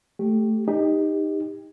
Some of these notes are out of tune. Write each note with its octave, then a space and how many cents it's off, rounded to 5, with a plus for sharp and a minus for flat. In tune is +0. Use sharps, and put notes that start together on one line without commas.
A3 +0 G4 +0
D#4 +0 G4 +25